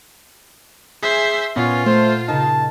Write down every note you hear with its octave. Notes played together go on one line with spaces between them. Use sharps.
G#4 C5 E5
A#2 B3 C#4 F4 F#5
A3 C5
C#3 D#4 A#4 A5 F6